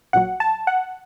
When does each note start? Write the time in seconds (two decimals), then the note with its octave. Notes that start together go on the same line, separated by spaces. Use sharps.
0.13 A#1 A#2 F#3 F#5
0.40 A5
0.67 F#5